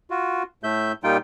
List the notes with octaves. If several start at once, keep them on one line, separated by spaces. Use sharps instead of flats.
F4 F#4
A2 A3 E5 G6
A#2 G3 D#4 F4 G5